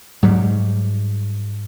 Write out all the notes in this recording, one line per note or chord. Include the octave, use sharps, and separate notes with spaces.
G#2 F#3 G3